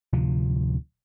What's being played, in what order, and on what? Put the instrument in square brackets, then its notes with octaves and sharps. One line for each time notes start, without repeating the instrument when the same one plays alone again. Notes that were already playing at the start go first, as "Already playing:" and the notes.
[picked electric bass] D1 D2 C3 F3